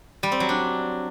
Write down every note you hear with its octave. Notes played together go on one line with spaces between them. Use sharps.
G3
C4
F#3
D4